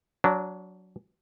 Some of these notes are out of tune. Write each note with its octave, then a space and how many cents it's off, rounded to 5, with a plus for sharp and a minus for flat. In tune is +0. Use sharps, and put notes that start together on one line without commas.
F#3 +0 D4 -20